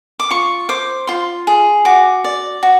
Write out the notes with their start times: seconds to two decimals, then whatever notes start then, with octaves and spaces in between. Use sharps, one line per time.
0.20 D6
0.30 F4 C#6
0.69 C5 D6
1.07 F4 C6
1.47 G#4
1.85 F#4 D6
2.24 D5
2.63 F#4